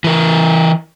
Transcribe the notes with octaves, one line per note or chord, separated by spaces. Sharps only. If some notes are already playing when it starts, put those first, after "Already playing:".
E3 A#4